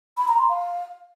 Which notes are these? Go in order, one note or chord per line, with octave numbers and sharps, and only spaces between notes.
B5
A#5
C6
F5